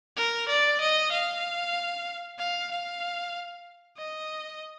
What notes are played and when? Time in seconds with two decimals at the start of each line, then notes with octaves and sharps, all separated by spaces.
0.17 A#4
0.49 D5
0.81 D#5
1.12 F5
2.39 F5
2.71 F5
3.98 D#5